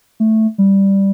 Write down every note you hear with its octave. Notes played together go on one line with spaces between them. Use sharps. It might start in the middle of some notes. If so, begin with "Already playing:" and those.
A3
G3